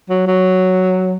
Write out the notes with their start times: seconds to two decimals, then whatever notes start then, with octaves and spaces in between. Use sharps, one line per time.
0.10 F#3
0.27 F#3